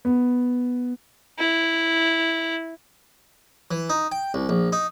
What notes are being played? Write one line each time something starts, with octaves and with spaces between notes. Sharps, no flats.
B3
E4
E3
D#4
G5
C2
A#1
D#4